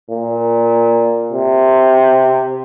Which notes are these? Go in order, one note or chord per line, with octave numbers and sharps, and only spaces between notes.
A#2
C3